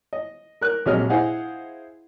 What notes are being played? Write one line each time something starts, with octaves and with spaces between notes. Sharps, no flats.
D#5
A#4 F#6
A#1 C3 F#3 G#3 D#5 F6
E4 G#4 C5 D#5 F5 F#5